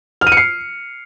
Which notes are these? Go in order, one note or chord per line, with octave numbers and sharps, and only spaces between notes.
F6
D#7
C#7
C7